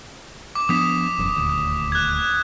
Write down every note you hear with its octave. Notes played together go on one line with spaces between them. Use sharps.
D6
F3 B3 D4 D#6 B6 E7
E1 F#2
D#1 D2
F#6 G#6